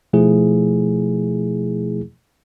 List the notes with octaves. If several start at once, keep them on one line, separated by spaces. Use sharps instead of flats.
B2 F3 A3 E4 G#4